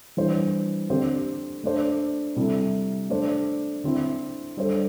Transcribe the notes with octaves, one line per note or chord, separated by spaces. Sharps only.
E3 G3 D4 C5
D3 C4 G4 C5
A3 D4 C5
C3 G3 E4 A4
A3 D4 C5
D3 C4 E4
G3 D4 A4 C5